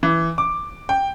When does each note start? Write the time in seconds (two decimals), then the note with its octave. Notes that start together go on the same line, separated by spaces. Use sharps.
0.03 E3
0.38 D6
0.89 G5